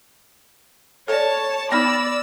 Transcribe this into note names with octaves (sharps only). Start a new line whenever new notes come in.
A4 C#5 D5 A5
B3 D#4 D5 B5 E6 F6 A#6